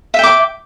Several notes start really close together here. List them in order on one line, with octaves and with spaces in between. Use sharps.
E5 G5 D6